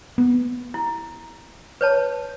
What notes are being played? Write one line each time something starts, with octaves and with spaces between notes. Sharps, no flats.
B3
E4
B4 C#5 A5